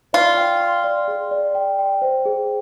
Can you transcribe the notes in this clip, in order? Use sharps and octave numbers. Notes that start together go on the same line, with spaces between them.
F4 D5
G5
C6
D5
G#4
D5
G5
G5
C5
G#4